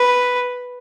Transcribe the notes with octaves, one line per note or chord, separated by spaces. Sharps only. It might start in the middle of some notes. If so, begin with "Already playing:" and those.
Already playing: B4